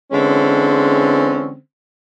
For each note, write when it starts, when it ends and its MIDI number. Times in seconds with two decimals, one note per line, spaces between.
0.12 1.55 50
0.12 1.55 52
0.12 1.55 56
0.12 1.55 60
0.12 1.55 61